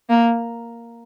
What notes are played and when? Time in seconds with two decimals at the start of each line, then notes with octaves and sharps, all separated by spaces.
0.09 A#3